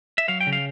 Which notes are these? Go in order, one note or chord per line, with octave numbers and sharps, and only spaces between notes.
E5
F#3 F5
G5
C#3
F5